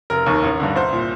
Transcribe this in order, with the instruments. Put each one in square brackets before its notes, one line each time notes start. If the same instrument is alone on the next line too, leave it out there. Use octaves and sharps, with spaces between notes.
[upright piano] F1 A#4
D#2 D#3
A1
G2 D3
C2 C5
A#2